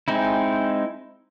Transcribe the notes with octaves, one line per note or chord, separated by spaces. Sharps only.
G#3 C4 D#4 E4